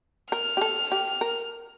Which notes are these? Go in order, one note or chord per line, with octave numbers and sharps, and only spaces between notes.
A#4 F6
G4
A4
G4
A#4